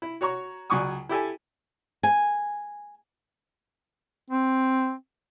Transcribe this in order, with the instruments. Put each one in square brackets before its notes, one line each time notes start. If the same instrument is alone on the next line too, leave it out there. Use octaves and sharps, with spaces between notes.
[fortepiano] E4
F#4 C#5 A#5 C#6
C#2 F#3 D5 G#5 C#6 D#6
E4 G4 A4 G#5
[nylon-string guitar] G#5
[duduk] C4